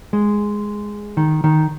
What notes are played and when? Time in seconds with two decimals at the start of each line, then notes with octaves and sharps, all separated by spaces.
0.13 G#3
1.17 D#3
1.44 D#3